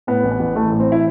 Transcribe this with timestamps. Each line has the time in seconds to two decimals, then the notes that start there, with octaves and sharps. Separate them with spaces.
0.07 A2 B3
0.23 A1
0.32 B3
0.39 A1
0.55 E3 A3
0.72 A2
0.80 C4
0.92 E4